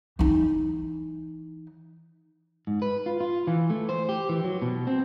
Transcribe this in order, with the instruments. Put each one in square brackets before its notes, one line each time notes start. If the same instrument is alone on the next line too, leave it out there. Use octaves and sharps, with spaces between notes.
[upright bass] E3 D#4
[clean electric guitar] G#2
B4
F4
F4
E3
A3
C5
G4
E3
F#3
B2
C4